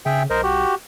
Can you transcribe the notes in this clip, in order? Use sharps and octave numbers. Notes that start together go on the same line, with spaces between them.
C#3 G#4 E5 G5
B1 A#4 C5 D#5
F#4 G4